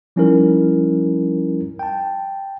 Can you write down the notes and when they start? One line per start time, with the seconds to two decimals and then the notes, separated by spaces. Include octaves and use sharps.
0.16 F3 G3 C#4 D#4 E4 A#4
1.79 G5 A5